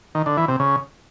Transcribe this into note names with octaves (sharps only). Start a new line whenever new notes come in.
D#3
D3
E3
C3
C#3